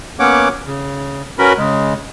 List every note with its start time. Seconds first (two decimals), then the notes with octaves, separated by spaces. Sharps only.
0.19 A#3 B3 C#4 C#5 F#5 D6
0.67 C#3
1.39 C#4 F#4 A#4 B4 B5
1.58 C#3 G#3